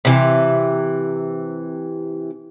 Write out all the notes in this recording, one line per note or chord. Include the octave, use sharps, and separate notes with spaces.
C3 E3